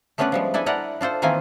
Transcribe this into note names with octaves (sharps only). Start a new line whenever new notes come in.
A3 B3 C#4 D4 B4 D5
F3 G3 G#3
D4 E4 A4 G#5
D4 E4 A#4 D5 F#5
D4 F4 A4 C5
D#3 E3 A#3 C4 F4 G#5